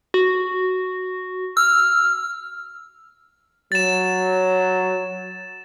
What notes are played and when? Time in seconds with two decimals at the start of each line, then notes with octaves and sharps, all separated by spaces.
0.14 F#4
1.57 E6 F6
3.72 F#3 A6 E7